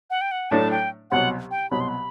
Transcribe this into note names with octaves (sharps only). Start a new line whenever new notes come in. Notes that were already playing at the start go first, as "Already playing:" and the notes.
F#5
G5
F#5
A2 F#3 A3 D4 A5
G5
C2 B2 F#3 F#5
G5
C2 B2 F#3 B5
C6
B5